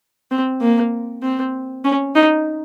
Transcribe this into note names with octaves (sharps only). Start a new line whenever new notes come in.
C4
A#3
C4
C#4
D#4